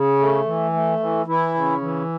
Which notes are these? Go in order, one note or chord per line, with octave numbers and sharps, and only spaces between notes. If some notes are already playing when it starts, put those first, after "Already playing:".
Already playing: C#3
A3
E3
A3
E3
E3 E4
C#3
E3